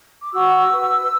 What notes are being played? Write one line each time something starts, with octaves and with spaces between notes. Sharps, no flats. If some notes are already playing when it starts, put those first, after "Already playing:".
D6
F#4 E6
B4